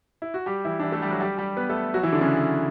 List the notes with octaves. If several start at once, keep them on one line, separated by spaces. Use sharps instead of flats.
E4
F#4
G3 G4
E3 E4
D4
E3 E4
A3 A4
G3 G4
F#3 F#4
G3 G4
G3 G4
B3 B4
A3 A4
F#3 F#4
E3 E4
D3 D4
C#3 C#4